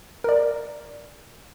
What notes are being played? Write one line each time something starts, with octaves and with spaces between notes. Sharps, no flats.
A#4 D5